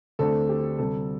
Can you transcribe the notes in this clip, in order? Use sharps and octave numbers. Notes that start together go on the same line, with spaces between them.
D2 D3 A3 C4 A4
G4
D2 C3 G3 A4